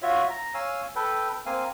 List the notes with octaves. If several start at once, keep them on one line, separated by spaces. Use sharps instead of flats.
F4 F#4 C#5 E5
A#5
C#5 F5 G#5 E6
A4 B4 G5
A#3 C4 F5 G#5